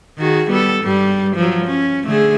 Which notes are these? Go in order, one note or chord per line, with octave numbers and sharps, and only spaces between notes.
D#3 F#4 G#4
G3 B3 A4
G2 G3
F3 F#3
C#4
D3 A3 G#4